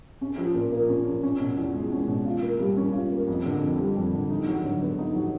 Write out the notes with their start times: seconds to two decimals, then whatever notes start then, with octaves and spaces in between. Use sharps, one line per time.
0.21 C#4
0.37 F3
0.54 A#2
0.72 A#3
0.89 C#4
1.07 F3
1.23 C#4
1.40 B2
1.57 E2
1.74 G#3
1.92 C#4
2.08 B2
2.26 F4
2.42 A#3
2.60 G3
2.77 C#4
2.93 F4
3.11 A#3
3.28 F2
3.45 D3
3.62 F2
3.79 G3
3.97 F2
4.13 D3
4.30 D#4
4.47 F#3
4.64 D3
4.82 B3
4.98 D#4
5.15 F#3